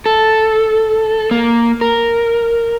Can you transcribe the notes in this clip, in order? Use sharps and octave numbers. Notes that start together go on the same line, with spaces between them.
A4
A#3
A#4